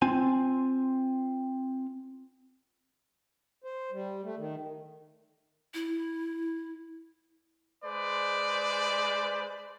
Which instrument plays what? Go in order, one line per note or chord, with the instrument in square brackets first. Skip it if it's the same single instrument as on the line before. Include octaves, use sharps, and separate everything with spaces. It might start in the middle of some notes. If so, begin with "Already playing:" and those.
[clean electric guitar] C4 F4 G#5
[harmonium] C5
G3
A3
D#3
[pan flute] E4
[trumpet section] G#3 B4 C5 D5